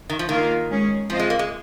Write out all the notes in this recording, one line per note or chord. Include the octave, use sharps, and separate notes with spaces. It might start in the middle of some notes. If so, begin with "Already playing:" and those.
D#3
F3
D#3 A#3 F4 A#4 F5
G#3 C#4 G#4
F3 C4 F4 C5 D#5
G#3
A#3
G#3